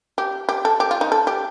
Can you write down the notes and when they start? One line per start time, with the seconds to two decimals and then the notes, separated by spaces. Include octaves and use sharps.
0.18 G4
0.49 G4
0.65 A4
0.80 G4
0.91 F4
1.01 D#4
1.12 A4
1.27 G4